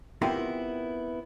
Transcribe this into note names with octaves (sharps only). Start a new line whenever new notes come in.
B3 C4 E4 F4 G4 A#4